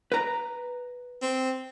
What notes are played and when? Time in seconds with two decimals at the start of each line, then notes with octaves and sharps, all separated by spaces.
0.12 B4 A#5
1.22 C4